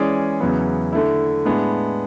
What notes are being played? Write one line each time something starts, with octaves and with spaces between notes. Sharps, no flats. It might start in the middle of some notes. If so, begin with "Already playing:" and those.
Already playing: E3 G#3 C#4 G#4 D5
E2 C#3 F#3 B3
D3 A3 E4
A2 G#3 B3 D4